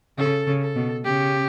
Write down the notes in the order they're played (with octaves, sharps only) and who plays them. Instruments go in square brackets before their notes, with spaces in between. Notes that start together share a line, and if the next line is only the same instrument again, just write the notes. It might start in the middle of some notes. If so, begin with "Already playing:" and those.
[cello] C#3 [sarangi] A4
[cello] C#3
[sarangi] A4
[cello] B2
[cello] C#3 [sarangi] G4